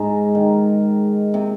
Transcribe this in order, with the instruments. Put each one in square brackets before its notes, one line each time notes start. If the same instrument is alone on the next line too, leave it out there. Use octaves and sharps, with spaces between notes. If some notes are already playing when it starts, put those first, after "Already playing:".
Already playing: [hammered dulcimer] G#2 G#3
D#3
C3